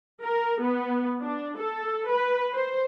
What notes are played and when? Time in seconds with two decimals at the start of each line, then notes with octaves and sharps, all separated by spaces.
0.23 A#4
0.62 B3
1.22 D4
1.58 A4
2.09 B4
2.55 C5